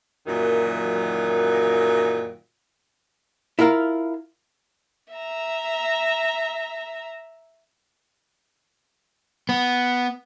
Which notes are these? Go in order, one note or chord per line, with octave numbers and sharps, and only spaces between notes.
F#2 A#2 D#3 E3 F#3
E4 F4 A#4 F5
E5 A#5
B3